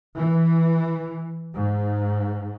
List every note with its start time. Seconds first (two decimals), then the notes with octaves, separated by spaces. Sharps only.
0.16 E3
1.55 G#2